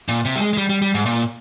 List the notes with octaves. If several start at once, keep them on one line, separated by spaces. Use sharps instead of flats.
A#2
C3
G3
G#3
G#3
G3
G3
G3
G#2
A#2